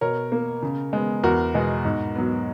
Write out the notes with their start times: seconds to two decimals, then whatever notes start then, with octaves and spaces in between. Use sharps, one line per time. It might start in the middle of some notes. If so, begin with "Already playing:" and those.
0.01 B2 A#4 C#5
0.32 A#3
0.63 C#3
0.93 G#3 B3
1.23 E2 F#4 A#4
1.54 B2 G#3 B3
1.85 G#2
2.16 F#3 B3